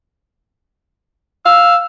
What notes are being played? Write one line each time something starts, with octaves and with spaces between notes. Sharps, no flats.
F5 E6